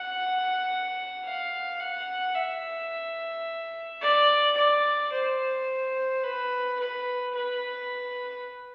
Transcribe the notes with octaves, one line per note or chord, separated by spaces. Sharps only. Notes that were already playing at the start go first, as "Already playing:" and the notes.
Already playing: F#5
F5
F#5
E5
D5
D5
C5
B4
B4
B4